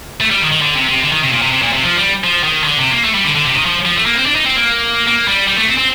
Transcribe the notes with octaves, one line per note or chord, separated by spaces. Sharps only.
A3
G3
D#3
D#3
D3
C3
C3
D3
D#3
C3
A#2
C3
C3
A#2
C3
F3
G3
F3
D#3
D3
C3
A#3
A3
G3
D3
D3
C3
D#3
F3
F3
A3
A#3
C4
D4
D#4
C4
A#3
A#3
G3
G3
A3
C4
C4